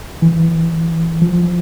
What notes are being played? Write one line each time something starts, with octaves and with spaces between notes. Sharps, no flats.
E3
F3